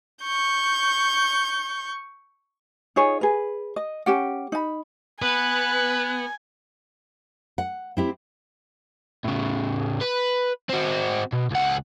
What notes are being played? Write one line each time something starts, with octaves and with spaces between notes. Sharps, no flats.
C#6 G6
D#4 F4 G#4 C#5
G#4 B4
D#5
C#4 G4 F#5
D#4 B5
B3 B4 G#5 F#6
F#5
C4 E4 G4
A2 C#3
B4
C4 F#4
B2
C#2 F#5